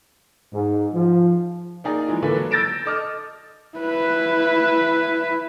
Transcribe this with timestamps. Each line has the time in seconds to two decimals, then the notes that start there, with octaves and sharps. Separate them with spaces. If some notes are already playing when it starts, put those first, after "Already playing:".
0.54 G#2
0.94 F3
1.84 A#3 D#4 G#4 D5
2.08 E3 F3 G#3
2.22 D3 E3 A#3 D4 A4 B4
2.35 F#3
2.51 E6 G6 A6 A#6 D7 E7
2.86 A4 D#5 D6 D#6 F6
3.78 E4 B4